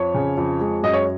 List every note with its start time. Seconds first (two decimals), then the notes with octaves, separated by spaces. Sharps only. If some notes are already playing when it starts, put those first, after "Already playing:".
Already playing: F2 C#5
0.14 C#3
0.37 F2
0.60 G#3
0.83 F#2 D#5
0.93 C#5